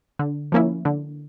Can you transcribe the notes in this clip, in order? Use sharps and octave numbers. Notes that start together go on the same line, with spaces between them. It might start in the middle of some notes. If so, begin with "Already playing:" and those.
D3
F3 A#3 C#4 E4
D3